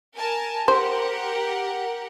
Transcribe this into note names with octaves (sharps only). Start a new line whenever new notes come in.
A#4 G#5 A5
G4 A#4 C5 F#5